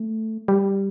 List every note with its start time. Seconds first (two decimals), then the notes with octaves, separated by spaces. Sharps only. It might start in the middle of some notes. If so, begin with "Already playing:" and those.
Already playing: A3
0.48 G3